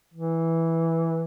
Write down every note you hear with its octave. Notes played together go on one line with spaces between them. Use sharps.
E3